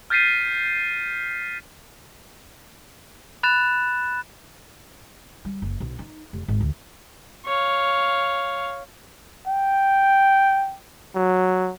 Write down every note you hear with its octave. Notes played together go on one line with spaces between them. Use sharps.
F6 G6 A6 B6 C7 D#7
B5 F#6 A6 E7
G3
F#1
B1
D#4
F1
G#1
D2
C#5 F5
G5
F#3